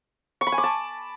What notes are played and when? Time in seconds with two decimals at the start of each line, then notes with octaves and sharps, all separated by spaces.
0.41 C#6
0.47 B5
0.52 G#5
0.58 D6
0.64 A5